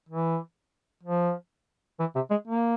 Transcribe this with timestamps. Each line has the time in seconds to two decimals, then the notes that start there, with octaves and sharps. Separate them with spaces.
0.09 E3
1.03 F3
2.00 E3
2.16 C3
2.31 G#3
2.48 A#3